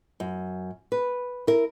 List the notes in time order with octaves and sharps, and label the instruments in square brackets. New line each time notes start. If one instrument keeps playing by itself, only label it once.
[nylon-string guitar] F#2
B4
E4 A#4